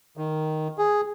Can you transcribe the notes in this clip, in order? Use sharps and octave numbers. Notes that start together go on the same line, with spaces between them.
D#3
G#4